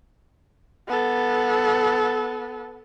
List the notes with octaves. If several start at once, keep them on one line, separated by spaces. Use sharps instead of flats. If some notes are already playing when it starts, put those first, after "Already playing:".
B3 A4